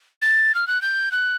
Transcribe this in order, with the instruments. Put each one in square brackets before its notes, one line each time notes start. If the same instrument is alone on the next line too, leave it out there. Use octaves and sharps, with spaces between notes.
[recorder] A6
F6
F#6
G6
F#6